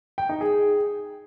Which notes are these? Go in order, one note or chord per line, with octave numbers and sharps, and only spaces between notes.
G5
D#4
G#4